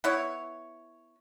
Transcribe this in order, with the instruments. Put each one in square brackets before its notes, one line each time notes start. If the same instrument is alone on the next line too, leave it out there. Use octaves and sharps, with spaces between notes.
[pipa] B3 E4 C#5